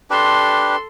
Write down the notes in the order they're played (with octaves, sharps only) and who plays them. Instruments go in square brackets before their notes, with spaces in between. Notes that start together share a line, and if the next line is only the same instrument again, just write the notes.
[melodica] D4 G4 B4 [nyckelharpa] A4 C6